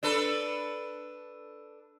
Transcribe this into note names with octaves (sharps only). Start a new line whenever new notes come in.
D4 A4 B4